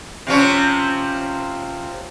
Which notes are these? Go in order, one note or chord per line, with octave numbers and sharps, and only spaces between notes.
C3 F3 C#4